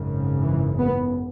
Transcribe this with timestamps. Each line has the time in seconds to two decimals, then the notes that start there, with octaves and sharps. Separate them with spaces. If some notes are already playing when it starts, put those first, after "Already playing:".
Already playing: G#1 F#2 C#3
0.44 E3
0.79 B3